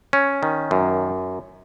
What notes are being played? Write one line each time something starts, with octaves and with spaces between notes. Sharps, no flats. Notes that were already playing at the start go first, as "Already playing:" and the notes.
C#4
D#3
F#2